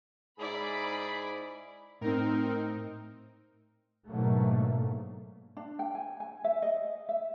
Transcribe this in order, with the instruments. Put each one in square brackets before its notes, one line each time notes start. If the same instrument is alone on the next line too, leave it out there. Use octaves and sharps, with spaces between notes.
[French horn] G#2 [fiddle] E4 D5 [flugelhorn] G#4 [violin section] B5
[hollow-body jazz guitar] A2 [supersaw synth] C4 D#4 A#4
[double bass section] G#2 B2 D3 F#3 A3 A#3
[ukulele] D4
G5
G#5
G#5
E5
D#5
E5